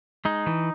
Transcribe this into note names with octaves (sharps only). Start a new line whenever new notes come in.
G#3 D#4
E3